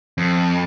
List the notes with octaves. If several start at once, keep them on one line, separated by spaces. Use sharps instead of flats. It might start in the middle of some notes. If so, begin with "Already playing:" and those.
F2